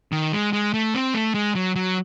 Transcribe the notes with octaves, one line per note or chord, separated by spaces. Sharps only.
D#3
G#3
G#3
A3
C4
A3
G#3
F#3
F#3